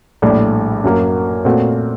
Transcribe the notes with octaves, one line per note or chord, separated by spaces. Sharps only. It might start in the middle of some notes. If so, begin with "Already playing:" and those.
A#1 A2 G3
F#2 F#3 A#3
A#2 A3 C4 F#4